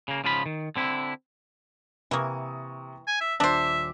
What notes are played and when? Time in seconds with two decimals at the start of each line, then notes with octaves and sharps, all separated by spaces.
0.08 C#3 A#3
0.24 G#2 C#3 F3 F4 A4 B5
0.46 D#3
0.76 D3 C4 E4
2.11 C3 E3 A#3 C#6 D#6
3.07 G#5
3.21 E5
3.40 D#1 D4 C5 E5 D6 E7